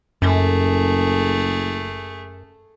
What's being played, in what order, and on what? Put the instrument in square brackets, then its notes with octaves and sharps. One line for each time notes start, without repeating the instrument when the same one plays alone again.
[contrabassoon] F#1 [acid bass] F#2 [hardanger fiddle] A3 G#4